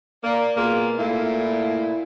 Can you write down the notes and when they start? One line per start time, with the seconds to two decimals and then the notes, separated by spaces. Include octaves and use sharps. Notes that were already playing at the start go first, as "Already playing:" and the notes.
0.22 A#3 D5
0.56 B2 A#3 F4 G#4
0.98 A#2 A3 E4